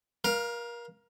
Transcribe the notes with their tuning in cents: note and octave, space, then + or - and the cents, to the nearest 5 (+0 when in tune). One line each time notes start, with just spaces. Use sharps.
A#4 +30 F5 +0